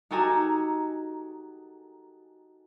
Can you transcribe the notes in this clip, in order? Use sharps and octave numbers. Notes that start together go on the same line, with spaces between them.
D#4 F#4 G4 A4 G#5 A#5